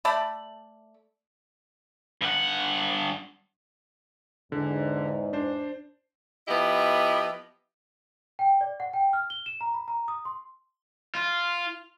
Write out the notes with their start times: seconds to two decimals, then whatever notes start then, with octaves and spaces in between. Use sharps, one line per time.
0.05 A3 D5 A5 B5
2.21 G2 F#5
4.52 E2 G#2 D3
5.33 D4 C5
6.47 F3 B3 E4 G4 D#5
8.39 G5
8.61 D5
8.80 F#5
8.93 G5
9.13 F6
9.30 G7
9.46 E7
9.61 A#5
9.74 B5
9.88 A#5
10.08 D#6
10.25 C6
11.15 F4